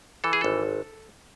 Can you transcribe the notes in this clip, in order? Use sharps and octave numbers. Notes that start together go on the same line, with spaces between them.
E3 A4
G#4
G#1 A4